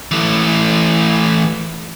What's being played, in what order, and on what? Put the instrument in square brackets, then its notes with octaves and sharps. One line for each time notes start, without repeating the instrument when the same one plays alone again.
[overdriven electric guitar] E3 A3